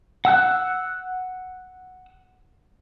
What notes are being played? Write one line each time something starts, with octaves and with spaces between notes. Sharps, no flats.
F#5 E6 F#6